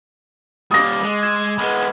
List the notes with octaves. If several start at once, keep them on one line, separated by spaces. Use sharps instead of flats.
G3 A#3 D6 D#6 A6 A#6
G#3
E6 G#6 E7
G#3 B3 B5 F6